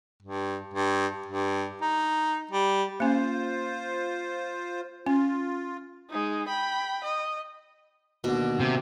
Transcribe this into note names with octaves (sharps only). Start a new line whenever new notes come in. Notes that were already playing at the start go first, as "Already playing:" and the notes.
G2
G2
G2
D#4
G3
A#3 C#4 F4 C5
C#4 F4
G#3 D#4
G5 B5
D#5
D#2 B2 D3
C3